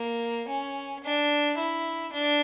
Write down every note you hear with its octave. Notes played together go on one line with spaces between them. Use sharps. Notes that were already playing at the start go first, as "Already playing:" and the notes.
Already playing: A#3
C#4
D4
E4
D4